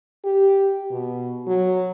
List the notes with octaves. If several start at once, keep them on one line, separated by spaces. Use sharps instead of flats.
G4
B2
F#3